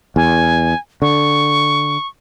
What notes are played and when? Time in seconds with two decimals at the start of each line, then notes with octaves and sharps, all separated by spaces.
0.16 E2 G#5
1.02 D3 C#6